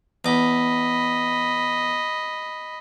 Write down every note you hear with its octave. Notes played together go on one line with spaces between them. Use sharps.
E2 D#5 B5 D6